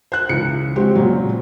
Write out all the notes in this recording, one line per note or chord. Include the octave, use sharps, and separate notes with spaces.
C5 F#6
C#2 E3 C#7
G#3 C4 F#4 G4
A#2 C#3 F#3